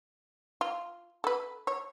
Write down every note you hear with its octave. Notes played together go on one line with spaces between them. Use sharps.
F4
A4 B4
C#5